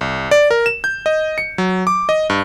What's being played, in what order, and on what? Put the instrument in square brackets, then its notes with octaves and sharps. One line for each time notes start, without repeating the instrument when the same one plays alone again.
[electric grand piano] C2
D5
A#4
E7
G6
D#5
C#7
F#3
D6
D#5
G2